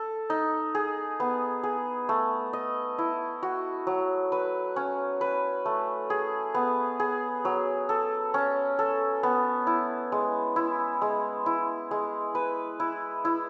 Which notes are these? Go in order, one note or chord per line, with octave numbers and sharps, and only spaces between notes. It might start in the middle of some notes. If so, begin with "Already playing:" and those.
Already playing: A4
D#4
G#4
B3
G#4
A3
D#5
E4
F#4
F#3
B4
C#4
B4
A3
G#4
B3
G#4
F#3
A4
C#4
A4
B3
E4
G#3
E4
G#3
E4
G#3
B4
E4
E4